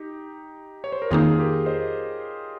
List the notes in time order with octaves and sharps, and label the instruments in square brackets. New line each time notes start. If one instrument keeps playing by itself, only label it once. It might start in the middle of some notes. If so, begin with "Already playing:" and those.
Already playing: [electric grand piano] D#4 G4
C#5
C5
A#4
[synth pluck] F2 D#3 A#3 D#4 [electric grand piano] F4 G#4
[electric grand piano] G#4
G4 A#4
C5 D#5